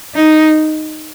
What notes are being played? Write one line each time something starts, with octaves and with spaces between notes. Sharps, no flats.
D#4